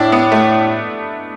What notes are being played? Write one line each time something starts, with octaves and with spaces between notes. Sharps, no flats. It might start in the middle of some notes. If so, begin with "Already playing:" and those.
Already playing: A2 D4 E4
B3
A3